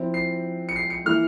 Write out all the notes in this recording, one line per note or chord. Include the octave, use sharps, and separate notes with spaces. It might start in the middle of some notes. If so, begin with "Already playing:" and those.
Already playing: F3 C4 E4
C7
C#7
C7
C#7
E3 A#3 E4 F6